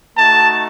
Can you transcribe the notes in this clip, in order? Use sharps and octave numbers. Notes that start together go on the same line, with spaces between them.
A3 D#4 F#4 A5